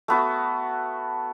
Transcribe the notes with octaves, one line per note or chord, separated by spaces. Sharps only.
A3 B3 F#4